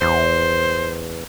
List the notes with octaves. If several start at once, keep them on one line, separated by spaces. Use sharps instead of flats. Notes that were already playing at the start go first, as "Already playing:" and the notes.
E2 C5